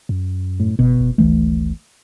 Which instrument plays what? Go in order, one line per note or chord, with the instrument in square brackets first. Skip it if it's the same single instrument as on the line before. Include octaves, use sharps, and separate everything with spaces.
[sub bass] F#2
[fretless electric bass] A2
[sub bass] F#1 [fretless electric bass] B2
[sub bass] F1
[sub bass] G#1 [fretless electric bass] D2 E3 A3